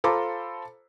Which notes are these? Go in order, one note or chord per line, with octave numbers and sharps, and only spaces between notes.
F4 A4 C5 A#5 B5 D6